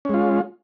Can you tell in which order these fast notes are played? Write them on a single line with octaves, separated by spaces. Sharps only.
C#4 G#3 F4